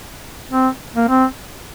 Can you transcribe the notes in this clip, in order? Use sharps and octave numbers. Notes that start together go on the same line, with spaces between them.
C4
A#3
C4